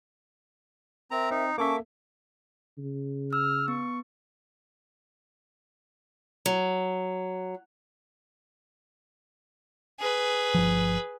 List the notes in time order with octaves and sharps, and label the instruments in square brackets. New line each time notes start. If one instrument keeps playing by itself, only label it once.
[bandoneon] C4 A#5 [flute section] A#4 E5
[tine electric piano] C4 [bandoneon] D#4
[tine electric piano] A#3 A4 E5 [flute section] C#4 A5 C#6 [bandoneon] D6
[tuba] C#3
[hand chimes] E6 [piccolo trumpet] F6
[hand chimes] B3 [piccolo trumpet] C#6
[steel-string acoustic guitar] F#3
[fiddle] G#4 B4
[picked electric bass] G1 F3